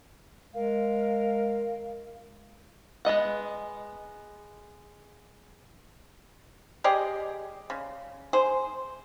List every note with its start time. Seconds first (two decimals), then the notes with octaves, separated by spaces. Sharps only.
0.54 G#3 A#4 F5
3.05 G#3 B3 D#5 F#5
6.84 G4 G#4 D5 D#5
7.70 C#3
8.33 G#4 C5